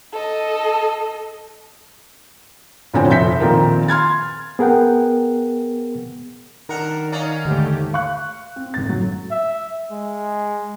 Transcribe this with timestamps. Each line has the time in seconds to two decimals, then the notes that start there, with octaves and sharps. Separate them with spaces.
0.13 A4 D#5
2.94 G1 A2 D3 F3 C4 G#5
3.08 F1 A#1 E5 G6 B6
3.40 A#1 A#2 D#3 C4 F4 A#4
3.88 C6 F6 G#6 A6
4.59 B3 G#4 A#4 F#5 G5
6.69 D#3 D4 A#4 F#5 A#5
7.12 C#4 D#4 D5 F5
7.45 D#2 G#2 D3 A3 G4
7.93 F5 C#6 F#6
8.56 C4
8.74 F#1 G#2 A6
8.85 A2 F#3
9.31 E5
9.91 G#3